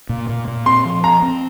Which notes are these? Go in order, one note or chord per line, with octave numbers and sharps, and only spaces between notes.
A#2
A#2
A#2
C4 C6
F3
C4 A#5
C4